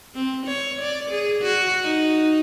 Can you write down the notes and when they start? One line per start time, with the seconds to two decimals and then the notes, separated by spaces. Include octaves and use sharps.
0.15 C4
0.46 C#5
0.81 D5
1.10 G#4
1.42 F#4
1.83 D#4